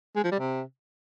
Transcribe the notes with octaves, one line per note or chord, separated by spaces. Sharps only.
G#3
F3
G3
C3